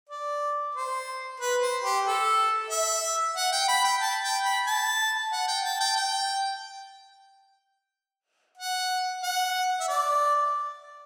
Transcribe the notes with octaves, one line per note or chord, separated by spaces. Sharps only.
D5
C5
B4
C5
G4
A4
E5
F#5
G5
B5
G5
A5
G5
B5
A5
F#5
G5
A5
G5
G5
F#5
F#5
E5
D5